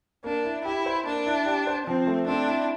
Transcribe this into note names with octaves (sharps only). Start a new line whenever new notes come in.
A#3 D4
E4
E4 G4
C5
A#3 D4
E4
G4
C5
F3 C4
A3
C4 D4
E4